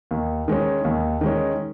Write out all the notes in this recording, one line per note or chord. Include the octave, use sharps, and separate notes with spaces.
D#2
D#3 G#3 C#4
D#2
D#3 G#3 C#4